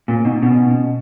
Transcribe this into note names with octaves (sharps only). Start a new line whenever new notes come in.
A#2 C#4
B2 D#4
B2 C#4